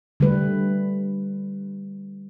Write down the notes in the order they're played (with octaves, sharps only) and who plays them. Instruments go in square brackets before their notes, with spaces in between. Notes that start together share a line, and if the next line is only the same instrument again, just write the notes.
[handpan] D3 G3 A3 B4